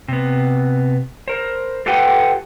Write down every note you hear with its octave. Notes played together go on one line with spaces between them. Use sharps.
C3 B3
A#4 C5
F4 G4 A4 B4 F#5 G5